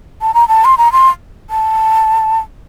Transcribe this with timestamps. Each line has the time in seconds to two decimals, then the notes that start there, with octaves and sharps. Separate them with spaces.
0.22 A5
0.34 A#5
0.48 A5
0.65 C6
0.78 A#5
0.92 C6
1.50 A5